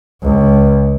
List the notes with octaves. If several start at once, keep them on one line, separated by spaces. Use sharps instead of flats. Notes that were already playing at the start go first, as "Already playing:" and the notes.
C#2